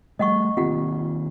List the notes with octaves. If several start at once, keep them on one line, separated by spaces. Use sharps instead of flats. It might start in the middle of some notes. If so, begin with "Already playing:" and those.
G3 A3 D#5 F#5 C#6
D#3 A#3 C4 F4 G4 F#5